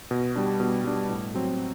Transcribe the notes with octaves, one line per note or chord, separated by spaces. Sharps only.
B2
G3 D4
B2
G3 D4
A2
F#3 C4